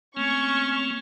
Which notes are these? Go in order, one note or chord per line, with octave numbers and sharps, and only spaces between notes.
A3 A#3 C4 C#4 C#6